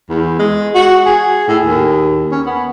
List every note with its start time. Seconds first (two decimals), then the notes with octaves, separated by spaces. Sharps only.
0.10 E2
0.39 G#3
0.75 F#4
1.06 G#4
1.48 A2
1.64 D#2
2.31 C#4
2.46 B3